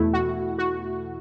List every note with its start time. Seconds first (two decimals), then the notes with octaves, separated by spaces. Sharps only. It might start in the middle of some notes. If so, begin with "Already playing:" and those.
Already playing: E2 B2 A3 E4
0.13 F#4
0.58 F#4